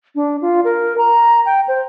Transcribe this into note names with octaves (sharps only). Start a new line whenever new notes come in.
D4
F4
A#4
A#5
G5
C5